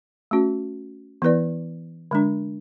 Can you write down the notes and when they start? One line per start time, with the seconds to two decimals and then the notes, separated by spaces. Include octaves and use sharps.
0.31 A3 C#4 F#4
1.22 E3 B3 E4 B4 D5
2.11 D3 G#3 D4